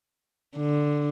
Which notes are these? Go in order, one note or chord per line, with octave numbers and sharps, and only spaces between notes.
D3